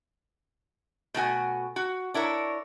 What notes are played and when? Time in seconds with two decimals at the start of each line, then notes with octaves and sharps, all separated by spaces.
1.14 B2 A3 F#4 G#5
1.76 F#4
2.14 D4 E4 A#4 C#5